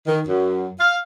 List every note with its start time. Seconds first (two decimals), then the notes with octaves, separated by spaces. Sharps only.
0.06 D#3
0.27 F#2
0.79 F5